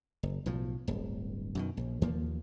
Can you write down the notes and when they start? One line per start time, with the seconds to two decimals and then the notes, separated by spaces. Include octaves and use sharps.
0.23 F#1
0.46 B1 A2 F3
0.88 D1 G1
1.55 F#2 B2 D#3
1.77 A#1
2.02 D#2 F3 A#3